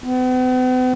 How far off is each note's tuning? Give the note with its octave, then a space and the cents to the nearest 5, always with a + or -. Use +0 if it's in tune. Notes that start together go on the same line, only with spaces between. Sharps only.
B3 +45